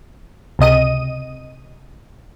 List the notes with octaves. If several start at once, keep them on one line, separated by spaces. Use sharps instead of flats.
C#2 C3 D#5 D#7